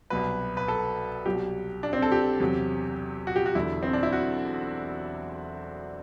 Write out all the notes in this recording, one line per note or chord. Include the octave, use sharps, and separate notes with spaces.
C2 B2 F#3 B4
B4
A4
C2 B2 F#3 G4
D4
C4
A4
G4
E2 C3 F#3
F#4
G4
F#4
E1 E2 D3 F#3 E4
C4
D4
E4
F#4